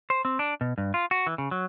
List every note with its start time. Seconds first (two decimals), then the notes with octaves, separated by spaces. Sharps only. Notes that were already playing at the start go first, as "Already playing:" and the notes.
0.10 C5
0.25 C4
0.39 D4
0.61 B2
0.78 G2
0.94 F4
1.11 F#4
1.27 E3
1.38 C#3
1.51 F#3